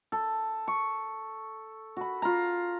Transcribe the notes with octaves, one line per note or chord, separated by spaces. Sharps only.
A4
C#6
F#4 B5
F4 A#5